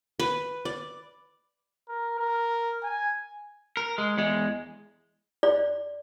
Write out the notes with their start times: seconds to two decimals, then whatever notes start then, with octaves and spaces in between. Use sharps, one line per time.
0.20 B4
0.65 D5
1.88 A#4
2.19 A#4
2.83 G#5
3.77 A#4
3.98 G#3
4.18 E2 G#3
5.43 D5